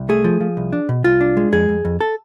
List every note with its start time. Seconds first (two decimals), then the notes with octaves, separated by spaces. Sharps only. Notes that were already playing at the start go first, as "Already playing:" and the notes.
Already playing: C2
0.09 A3 G#4
0.24 F3
0.40 F3
0.57 C2
0.73 D4
0.89 B2
1.04 C2 F4
1.21 D4
1.37 G#3
1.52 F2 G#4
1.69 F2
1.85 F2
2.01 A4